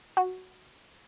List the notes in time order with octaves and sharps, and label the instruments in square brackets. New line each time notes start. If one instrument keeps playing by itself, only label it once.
[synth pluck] F#4